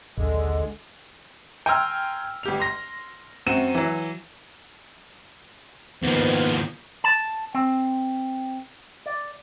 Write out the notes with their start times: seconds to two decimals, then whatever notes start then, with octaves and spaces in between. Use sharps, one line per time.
0.18 A#1 D#2 D3 G#3
1.66 G5 G#5 A#5 C6 E6 F6
2.43 G1 G4 F7
2.60 C6 A#6
3.46 F#2 C4 F#4 D#7 E7
3.75 E3 F#3
6.03 D#2 G#2 D#3 F3 B3
7.04 A5
7.55 C4
9.06 D5